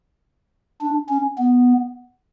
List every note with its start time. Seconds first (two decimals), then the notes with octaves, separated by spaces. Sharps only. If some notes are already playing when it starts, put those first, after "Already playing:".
0.81 D4
1.09 C#4
1.39 B3